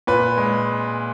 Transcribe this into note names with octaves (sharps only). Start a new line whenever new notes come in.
A#2 B4
G#3